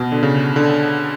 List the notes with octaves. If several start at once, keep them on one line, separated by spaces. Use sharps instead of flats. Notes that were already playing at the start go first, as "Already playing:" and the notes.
Already playing: B2
D3
C#3
D3